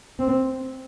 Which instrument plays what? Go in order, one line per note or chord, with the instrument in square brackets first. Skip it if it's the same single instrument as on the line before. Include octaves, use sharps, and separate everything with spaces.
[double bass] C4